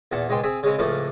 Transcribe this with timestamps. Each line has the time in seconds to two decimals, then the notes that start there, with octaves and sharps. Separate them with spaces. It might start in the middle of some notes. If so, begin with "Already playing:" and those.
0.12 E2 A#2 F#5 A5
0.29 C#2 G#2 G#3 G5 C6
0.43 C4 G#4 E5
0.63 C#3 G#3 C4
0.79 C#2 A2 F3 A3 A#3